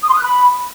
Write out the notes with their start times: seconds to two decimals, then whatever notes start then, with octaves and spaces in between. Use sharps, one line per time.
0.03 D#6
0.08 C6
0.13 D#6
0.18 F#6
0.24 B5